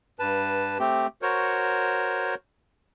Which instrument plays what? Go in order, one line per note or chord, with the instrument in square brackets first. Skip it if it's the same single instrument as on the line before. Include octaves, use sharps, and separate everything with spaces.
[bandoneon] G2 B4 A5
A3 C4 G4
F#4 A#4 C5 C#5